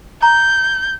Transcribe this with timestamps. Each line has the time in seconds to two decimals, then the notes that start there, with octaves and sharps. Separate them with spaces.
0.22 A#5 G6